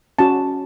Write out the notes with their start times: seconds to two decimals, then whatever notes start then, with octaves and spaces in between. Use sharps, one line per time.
0.19 C#4 F#4 A5